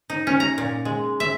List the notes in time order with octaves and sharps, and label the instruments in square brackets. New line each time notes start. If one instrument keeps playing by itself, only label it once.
[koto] D#4
C#4
A#5
A#2
G#3
E5